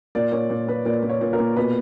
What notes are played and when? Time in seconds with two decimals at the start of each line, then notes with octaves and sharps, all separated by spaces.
0.15 A#2 D5
0.32 A#2 C#5
0.50 A#2
0.67 A#2 B4
0.85 A#2 D5
1.03 A#2
1.09 C#5
1.21 A#2
1.33 A#4
1.39 A#2
1.56 B2 B4